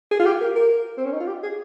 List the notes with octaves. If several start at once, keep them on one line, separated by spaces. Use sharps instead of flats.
G#4
F4
G4
A#4
A#4
C4
C#4
D#4
F4
G4
G#4